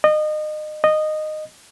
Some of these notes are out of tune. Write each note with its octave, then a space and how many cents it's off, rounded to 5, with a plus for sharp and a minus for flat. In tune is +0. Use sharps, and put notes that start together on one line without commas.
D#5 -30
D#5 -15